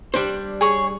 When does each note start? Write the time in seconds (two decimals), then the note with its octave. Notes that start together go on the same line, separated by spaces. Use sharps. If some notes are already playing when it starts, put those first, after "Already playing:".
0.14 G3 D4 C5
0.61 G#4 C#5 C#6